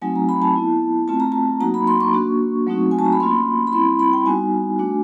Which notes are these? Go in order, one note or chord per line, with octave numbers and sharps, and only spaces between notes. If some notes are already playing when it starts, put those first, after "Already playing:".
F#3 A3 C4 D#4 F#4 G#5
A#5
B5
A5
B3 E4
A3 C4 F4 A5
A#5
A5
F#3 A#3 D#4 F#4 A#5
B5
C6
C#6
A#3 D4 F#4
F#3 A3 C4 D#4 F#4
G#5
A5
A#5
B5
A#3 C#4 F4 C6
B5
G3 C4 E4 C6
B5
G5
G3 B3 D#4 F#4 G#5
A3 D4 F#4